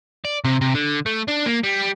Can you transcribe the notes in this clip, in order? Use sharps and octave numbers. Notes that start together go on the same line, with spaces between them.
D5
C3
C3
D3
A3
D4
A#3
G3